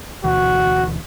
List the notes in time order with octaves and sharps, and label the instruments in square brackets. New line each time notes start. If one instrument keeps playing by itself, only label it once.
[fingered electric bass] D2 B2 E3 [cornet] F#4